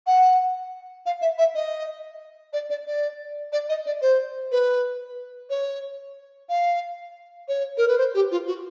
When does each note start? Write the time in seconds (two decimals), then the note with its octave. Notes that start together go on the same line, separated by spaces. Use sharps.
0.06 F#5
1.05 F5
1.21 E5
1.38 E5
1.54 D#5
2.53 D5
2.69 D5
2.87 D5
3.52 D5
3.69 D#5
3.86 D5
4.01 C5
4.51 B4
5.49 C#5
6.49 F5
7.48 C#5
7.77 A#4
7.87 B4
7.98 C5
8.14 G4
8.31 F4
8.47 F#4